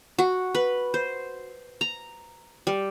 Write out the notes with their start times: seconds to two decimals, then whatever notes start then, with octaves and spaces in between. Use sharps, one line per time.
0.18 F#4
0.55 B4
0.94 C5
1.81 A#5
2.67 G3